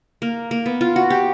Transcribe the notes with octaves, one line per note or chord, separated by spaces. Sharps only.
A#3
A#3
B3
F4
F#4
G4